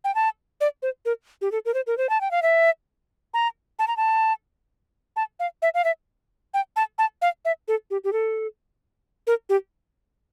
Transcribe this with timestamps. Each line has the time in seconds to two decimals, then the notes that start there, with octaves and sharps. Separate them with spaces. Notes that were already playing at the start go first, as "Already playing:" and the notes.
0.04 G5
0.15 A5
0.61 D5
0.82 C5
1.05 A#4
1.42 G4
1.52 A4
1.65 A#4
1.74 C5
1.87 A#4
1.98 C5
2.09 A5
2.21 G5
2.31 F5
2.42 E5
3.34 A#5
3.79 A5
3.88 A#5
3.97 A5
5.16 A5
5.40 F5
5.62 E5
5.74 F5
5.85 E5
6.54 G5
6.76 A5
6.98 A5
7.22 F5
7.45 E5
7.68 A4
7.91 G4
8.04 G4
8.13 A4
9.27 A#4
9.49 G4